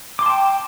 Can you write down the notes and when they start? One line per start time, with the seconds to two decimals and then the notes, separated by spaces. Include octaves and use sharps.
0.19 D6
0.22 C6
0.26 A5
0.30 G5